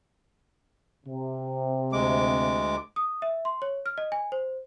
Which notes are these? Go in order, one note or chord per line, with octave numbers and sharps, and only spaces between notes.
C3
D2 G#3 D6
D#6
E5
C6
C#5
F6
D#5
G#5
C5